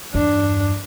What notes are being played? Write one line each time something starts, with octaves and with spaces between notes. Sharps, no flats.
E2 G2 D4